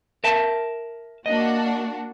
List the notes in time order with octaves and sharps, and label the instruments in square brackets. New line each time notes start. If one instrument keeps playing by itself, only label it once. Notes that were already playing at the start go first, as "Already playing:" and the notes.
[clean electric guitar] A#4 E5 A5
[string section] A#3 D4 F#4 [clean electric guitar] D#5